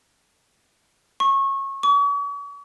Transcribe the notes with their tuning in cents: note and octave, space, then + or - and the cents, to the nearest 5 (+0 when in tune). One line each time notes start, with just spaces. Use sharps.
C#6 -25
C#6 +45